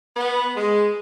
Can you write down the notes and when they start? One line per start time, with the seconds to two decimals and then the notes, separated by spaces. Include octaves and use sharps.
0.16 B3
0.56 G#3